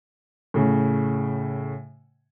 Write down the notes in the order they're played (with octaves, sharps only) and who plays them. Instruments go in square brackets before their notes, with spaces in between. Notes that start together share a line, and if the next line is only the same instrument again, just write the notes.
[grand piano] A2 C#3